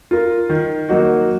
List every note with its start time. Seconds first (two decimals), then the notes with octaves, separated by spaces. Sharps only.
0.11 F4 A#4
0.49 D#3
0.89 F#3 A#3 D#4 F#4